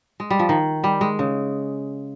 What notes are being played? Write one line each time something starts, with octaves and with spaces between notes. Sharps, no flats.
G#3
G3
F3
D#3
G3
G#3
C#3